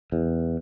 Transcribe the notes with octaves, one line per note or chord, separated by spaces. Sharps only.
E2